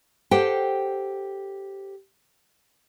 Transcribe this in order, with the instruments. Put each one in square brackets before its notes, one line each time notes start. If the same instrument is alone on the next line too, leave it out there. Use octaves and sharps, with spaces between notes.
[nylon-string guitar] G4 A4 C5 F#5 G5